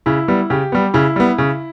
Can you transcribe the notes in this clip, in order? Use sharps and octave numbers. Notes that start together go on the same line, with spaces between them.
C#3 E4
G3 B3
C#3 G4
G3 B3
C#3 E4
G3 B3
C#3